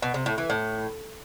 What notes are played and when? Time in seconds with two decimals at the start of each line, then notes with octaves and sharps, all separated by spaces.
0.02 B2
0.14 C3
0.26 A2
0.38 E3
0.50 A2